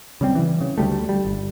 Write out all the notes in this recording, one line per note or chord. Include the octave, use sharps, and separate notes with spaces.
C#3 G3 C4
E3
C#3
D2 G3 A3
G3
G1